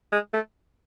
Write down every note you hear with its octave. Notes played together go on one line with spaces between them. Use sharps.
G#3
A3